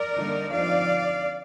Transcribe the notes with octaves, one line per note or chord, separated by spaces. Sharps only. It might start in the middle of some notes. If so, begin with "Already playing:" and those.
Already playing: A#4 D5
D3 G3 A#3 D#4
F3 C4 D#4 D5 F5